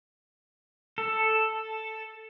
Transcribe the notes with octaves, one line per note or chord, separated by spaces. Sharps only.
A4